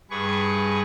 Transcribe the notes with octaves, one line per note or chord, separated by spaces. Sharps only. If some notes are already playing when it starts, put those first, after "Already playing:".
G2 G#4 B4 C#6